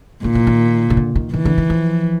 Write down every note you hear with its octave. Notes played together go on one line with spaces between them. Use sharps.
A#2 D#3
E3
D#3
D#3
D3
D#3
D#3 E3
D3
D#3
F3